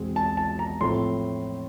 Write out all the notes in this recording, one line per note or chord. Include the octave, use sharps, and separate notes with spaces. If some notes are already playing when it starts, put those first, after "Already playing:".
Already playing: E2 B2 G#3 C4
A5
A5
A#5
A2 F3 A3 C4 C6